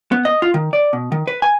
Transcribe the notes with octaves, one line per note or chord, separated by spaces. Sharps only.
B3
D#5
F4
D#3
D5
B2
D#3
B4
G#5